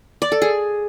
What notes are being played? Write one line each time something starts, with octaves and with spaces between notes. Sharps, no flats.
D5
A4
G#4